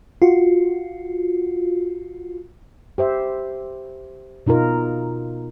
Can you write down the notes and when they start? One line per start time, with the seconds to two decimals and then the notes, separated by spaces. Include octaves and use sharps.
0.22 F4 F#4
2.98 G4 C5 E5
4.46 B2 D#4 F4 A#4